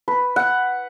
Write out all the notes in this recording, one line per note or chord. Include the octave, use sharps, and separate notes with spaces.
B4
F#5